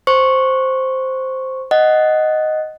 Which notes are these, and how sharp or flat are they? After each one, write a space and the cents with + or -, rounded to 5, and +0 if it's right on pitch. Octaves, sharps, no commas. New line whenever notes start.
C5 +0 C#6 -5
D#5 +0 F#5 +10